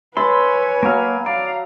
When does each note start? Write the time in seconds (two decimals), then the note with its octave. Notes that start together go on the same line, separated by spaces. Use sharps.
0.17 B4 C#5 E5 G#5 A5 B5 C6
0.83 F#3 A#3 F5 C#6
1.26 D5 F5 A#5